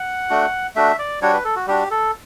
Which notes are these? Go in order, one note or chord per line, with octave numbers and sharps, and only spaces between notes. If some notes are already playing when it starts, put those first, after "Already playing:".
Already playing: F#5
A3 D4 F#4
A3 D4 F#4 E5
D5
G3 D4 F#4 C#5
B4
A4
F#4
G3 D4 F#4 G4
A4